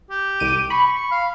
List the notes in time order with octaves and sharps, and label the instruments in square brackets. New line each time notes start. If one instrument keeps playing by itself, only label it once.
[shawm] G4
[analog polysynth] C2 D7 D#7
[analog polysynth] B5 [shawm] C#6
[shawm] F5